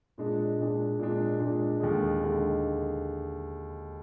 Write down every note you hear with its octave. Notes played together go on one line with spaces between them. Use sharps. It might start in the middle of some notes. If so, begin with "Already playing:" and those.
A#2 G#3 D4
A#2 G#3 D4
A#2 G#3 D4
A#2 G#3 D4
D#2 D3 G#3
D#2 D3 G#3